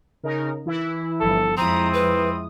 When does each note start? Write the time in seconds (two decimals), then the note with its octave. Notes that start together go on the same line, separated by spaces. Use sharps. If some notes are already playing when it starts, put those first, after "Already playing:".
0.23 C#3 D#4 A#4
0.66 E3 E4
1.21 G1 F3 A4
1.57 F2 G#3 C4 E4 A#5 D#6
1.94 B4